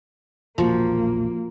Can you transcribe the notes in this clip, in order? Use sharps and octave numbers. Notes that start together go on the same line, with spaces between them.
E1 A#1 F3 A#3 F#4